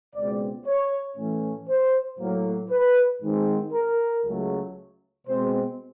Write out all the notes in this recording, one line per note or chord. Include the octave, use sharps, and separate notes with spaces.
C#2 B2 G#3 C4 D5
C#5
A2 E3 A3 C#4
C5
A2 F#3 A#3
B4
G#2 D#3 G#3 C4
A#4
C#2 C#3 F#3 A3
B2 G#3 C4 C5